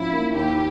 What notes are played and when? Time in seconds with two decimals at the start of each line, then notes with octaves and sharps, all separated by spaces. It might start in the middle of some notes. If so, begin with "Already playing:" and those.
Already playing: G#2 F3 C#4 E4
0.13 A#3
0.35 D#2 G4